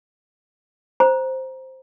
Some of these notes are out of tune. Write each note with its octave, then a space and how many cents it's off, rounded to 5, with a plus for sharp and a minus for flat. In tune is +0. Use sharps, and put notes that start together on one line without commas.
C5 +0 A#5 +20